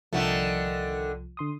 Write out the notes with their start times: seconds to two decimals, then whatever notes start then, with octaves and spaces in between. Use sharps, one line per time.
0.13 C2 D3 D#3 F3 A3
1.37 D3 C6 D#6